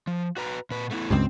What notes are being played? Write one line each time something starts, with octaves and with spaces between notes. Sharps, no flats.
F3
F#4 B4 A#5
A#2 B4
A3 B3 E4
C#2 G2 C4